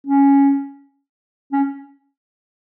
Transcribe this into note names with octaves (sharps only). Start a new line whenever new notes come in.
C#4
C#4